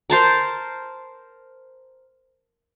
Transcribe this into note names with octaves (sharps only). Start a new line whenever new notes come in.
A#4 C5 A5 A#5